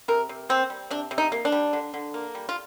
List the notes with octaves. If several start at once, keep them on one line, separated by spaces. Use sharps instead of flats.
C3 A#4
C3
A#3 C4
G3
C3 D4
C3
D#4
A#3
D4
G3
D3
D3
A#3
G3
F4